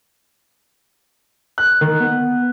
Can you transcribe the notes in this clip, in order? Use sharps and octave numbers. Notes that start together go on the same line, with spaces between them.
F#6
D#3
B3